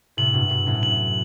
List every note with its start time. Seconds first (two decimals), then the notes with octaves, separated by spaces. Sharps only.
0.17 A2 C3 F#7
0.34 G2 B2
0.50 G2 F#7
0.66 F#2 A2
0.83 F#7